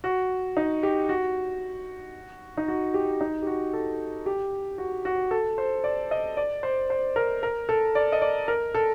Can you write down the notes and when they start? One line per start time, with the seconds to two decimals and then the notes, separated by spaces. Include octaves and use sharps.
0.04 F#4
0.57 D#4
0.83 G4
1.09 F#4
2.57 D#4
2.68 F#4
2.94 G4
3.21 D#4
3.42 G4
3.47 F#4
3.73 A4
4.26 G4
4.78 F#4
5.05 F#4
5.31 A4
5.58 C5
5.84 D5
6.11 D#5
6.37 D5
6.63 C5
6.90 C5
7.16 A#4
7.43 A#4
7.69 A4
7.95 D5
8.12 D#5
8.22 D5
8.48 A#4
8.75 A4